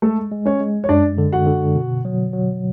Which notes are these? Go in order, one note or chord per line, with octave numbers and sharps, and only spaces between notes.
G#3 A3 A4
G#3
C#4 C#5
G#3
C#5
F#2 D4 D5
D3
F#4 F#5
D3
B2
F#3
F#3